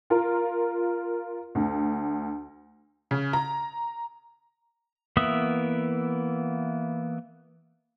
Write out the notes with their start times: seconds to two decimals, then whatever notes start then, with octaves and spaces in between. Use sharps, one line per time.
0.10 F4 A#4
1.55 D2
3.11 C#3
3.33 A#5
5.17 E3 A#3 B3 E5 D#6